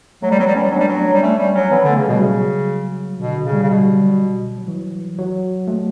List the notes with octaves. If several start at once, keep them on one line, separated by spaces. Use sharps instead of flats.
F#3 A3
G3
F#3 B3
G3
F#3 C#4
G3
F#3 D4
G3
F#3
G3
A3 C#4
G3
F#3 C#4
E3 B3
D3
A3
C#3
B2 G3
C#3 F#3
B2 D3
D3
C#3
G3
C#3
B2 G3
F#3
F#3
E3
F#3
A3